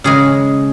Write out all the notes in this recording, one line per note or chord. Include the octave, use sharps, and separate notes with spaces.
C#3 G#3 G#4